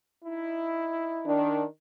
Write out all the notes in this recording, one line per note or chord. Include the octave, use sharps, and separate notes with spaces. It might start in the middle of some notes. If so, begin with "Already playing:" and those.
D#4 E4
D#3 D4